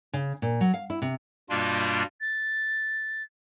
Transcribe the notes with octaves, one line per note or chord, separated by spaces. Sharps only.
C#3
A#2
F#3
F5
E4
C3
G2 B2 G3 A#3 D4 F4
A6